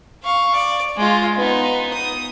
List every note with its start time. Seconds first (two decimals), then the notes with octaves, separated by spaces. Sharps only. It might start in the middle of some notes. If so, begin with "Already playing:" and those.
0.24 F5 C#6
0.55 D5
0.97 G#3 F4
1.36 B3 D#4
1.93 D#6